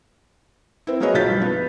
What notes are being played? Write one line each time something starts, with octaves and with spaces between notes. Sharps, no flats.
C4 E4
F#3 A#3 G#4 B4 C#5 D#5
B1 A#2 G6 A6 B6
G2 F3
B3